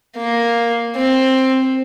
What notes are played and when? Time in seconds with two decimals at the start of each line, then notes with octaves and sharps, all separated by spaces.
0.17 A#3
0.95 C4